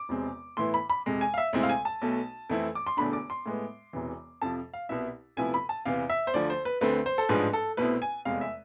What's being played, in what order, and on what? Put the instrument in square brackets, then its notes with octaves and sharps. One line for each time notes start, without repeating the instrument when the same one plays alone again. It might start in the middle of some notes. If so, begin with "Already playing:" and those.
Already playing: [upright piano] D6
E1 E2 C3 G#3 C4
A2 E3 B3 E4 C6
B5
B5
F2 C3 G#3
G#5
F5
E5
D2 C3 G#3 C4 E4
F5
G#5
A5
B1 B2 A3
F2 E3 A3 C4 E4
D6
C6
E1 E2 D3 A3 D4 B5
D6
C6
A2 G#3 B3
E1 E2 C3 E3
F2 C3 F3 A5
F5
C2 B2 B3 E4 E5
D2 C3 F3 B3 E4 G#5
B5
A5
E2 C3 E3 B3 F5
E5
C5
D2 D3 F3 D5
C5
B4
D2 D3 A3 C4 B4
C5
A4
A1 G#2 F3 G#3 D4 B4
A4
C2 B2 A3 C4 E4 B4
G#5
F1 E2 C3 G#3 F5
E5